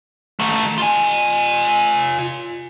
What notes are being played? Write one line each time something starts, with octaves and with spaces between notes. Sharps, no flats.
D#3 A3
F4 G#5